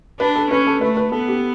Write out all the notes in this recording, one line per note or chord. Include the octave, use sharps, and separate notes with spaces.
D4 B4
A4
C#4 B4
A4
A3 B4
B4
B3 A4
G4